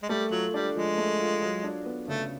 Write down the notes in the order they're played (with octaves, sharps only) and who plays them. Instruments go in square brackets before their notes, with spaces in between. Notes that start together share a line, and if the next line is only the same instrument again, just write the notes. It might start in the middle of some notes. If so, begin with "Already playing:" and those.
[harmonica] G#3
[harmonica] G3 [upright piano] A3
[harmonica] F#3 [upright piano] F4
[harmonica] G3 [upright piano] D4
[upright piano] F3 [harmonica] G#3
[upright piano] A3
F4
F#3
D4
B3
[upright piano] C#3 [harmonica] A3